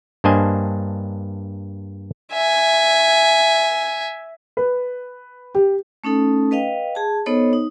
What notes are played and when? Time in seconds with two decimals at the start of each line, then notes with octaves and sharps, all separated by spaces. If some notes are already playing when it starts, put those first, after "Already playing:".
0.24 G2 A#3 D4 C5 D#5 G#5
2.33 E5 G#5
4.57 B4
5.55 G4
6.04 A3 C#4 D#4 A4
6.51 B4 D#5 F5 G5
6.95 G#4 A5
7.26 B3 D#4 A4 C5 C#5 D#5
7.53 D#4